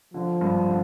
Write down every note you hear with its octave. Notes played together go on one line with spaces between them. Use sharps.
D3 F3
G2
D3